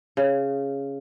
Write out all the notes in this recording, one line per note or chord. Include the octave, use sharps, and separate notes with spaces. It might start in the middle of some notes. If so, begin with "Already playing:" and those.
C#3